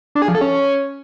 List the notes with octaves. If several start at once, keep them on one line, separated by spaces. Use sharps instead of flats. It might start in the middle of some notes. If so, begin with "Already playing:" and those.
D4
G#4
F3
A4
C#4